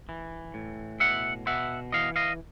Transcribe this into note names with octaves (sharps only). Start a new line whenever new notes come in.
E3
A2
B2 E5 F#5
B2 E5 F#5
E3 D#5 F5
D#5 F5